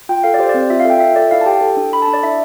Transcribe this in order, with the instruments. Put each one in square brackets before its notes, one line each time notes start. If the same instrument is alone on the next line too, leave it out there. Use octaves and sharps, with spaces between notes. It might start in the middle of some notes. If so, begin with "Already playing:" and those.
[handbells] F4 G5
A4 F5
D5
G4 C5
D5
C4
F4 E5
F5
A4 G5
F4 E5
A4 D5
E4 F5
A5
G4 G5
A4
D4
A4 B5
A5
D4
D5
E4 E5